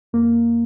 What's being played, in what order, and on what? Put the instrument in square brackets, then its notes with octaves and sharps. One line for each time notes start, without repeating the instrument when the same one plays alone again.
[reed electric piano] F2 A#3